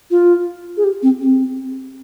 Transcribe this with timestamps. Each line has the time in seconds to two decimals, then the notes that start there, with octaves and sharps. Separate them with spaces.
0.11 F4
0.77 G#4
0.84 G4
1.03 C4
1.21 C4